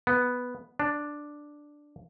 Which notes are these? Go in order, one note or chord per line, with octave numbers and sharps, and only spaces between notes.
B3
D4